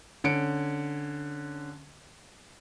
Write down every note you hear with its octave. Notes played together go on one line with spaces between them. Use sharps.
D3 C#4 C#7 D7